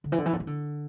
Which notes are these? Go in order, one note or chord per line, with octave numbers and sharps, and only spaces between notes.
D3
E3
D3
E3
D3
E3
D3